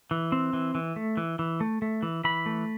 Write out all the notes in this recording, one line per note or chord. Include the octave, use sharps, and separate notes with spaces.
E3
C4
E3
E3
A3
E3
E3
A3
A3
E3
E3 B5
A3